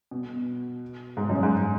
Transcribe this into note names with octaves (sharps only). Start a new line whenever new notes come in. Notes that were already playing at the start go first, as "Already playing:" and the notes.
B2
G#2
F#2
G#2